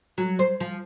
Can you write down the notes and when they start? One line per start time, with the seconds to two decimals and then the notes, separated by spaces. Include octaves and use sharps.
0.18 F#3
0.39 C5
0.60 F3